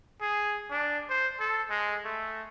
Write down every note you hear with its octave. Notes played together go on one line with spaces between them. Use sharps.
G#4
D4
C5
A4
G#3
A3